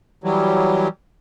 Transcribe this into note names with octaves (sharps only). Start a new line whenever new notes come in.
E3 F#3 G3